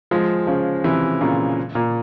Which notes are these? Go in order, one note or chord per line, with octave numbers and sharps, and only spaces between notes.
F3 G#3
C#3 F3
C3 E3
A#2 C#3
A#2